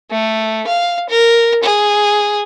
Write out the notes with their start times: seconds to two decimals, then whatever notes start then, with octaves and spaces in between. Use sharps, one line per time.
0.11 A3
0.67 F5
1.09 A#4
1.63 G#4